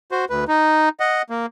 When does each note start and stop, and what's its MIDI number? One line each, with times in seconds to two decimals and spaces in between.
0.11 0.25 66
0.11 0.25 72
0.30 0.44 38
0.30 0.44 71
0.48 0.89 63
1.00 1.22 75
1.00 1.22 78
1.30 1.46 58